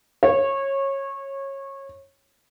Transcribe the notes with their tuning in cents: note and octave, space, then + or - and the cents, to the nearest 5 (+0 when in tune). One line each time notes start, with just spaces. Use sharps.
C#5 -20